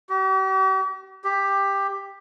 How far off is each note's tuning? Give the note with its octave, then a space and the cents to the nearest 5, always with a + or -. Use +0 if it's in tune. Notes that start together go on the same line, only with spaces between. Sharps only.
G4 -45
G4 +10